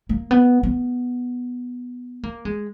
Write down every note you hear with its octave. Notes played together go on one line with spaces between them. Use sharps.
A#3
B3
B3
A#3
G#3